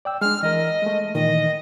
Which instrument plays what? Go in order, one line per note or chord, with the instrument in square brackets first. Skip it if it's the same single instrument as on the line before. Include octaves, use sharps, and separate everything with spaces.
[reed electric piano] D5 G5 E6
[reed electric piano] G#3 D4 [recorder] F6
[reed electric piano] E3 A#4 [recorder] D#5
[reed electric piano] G#3 A3
[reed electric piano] A#2 D#3 E3 [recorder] D#5